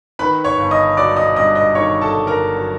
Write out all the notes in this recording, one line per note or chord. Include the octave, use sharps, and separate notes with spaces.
D#3 B4 B5
C#5 C#6
G1
D#5 D#6
F#3 D5 D6
D#5 D#6
G2 D#5 D#6
D#5 D#6
D#3 C#5 C#6
A4 A5
G1
A#4 A#5
F#3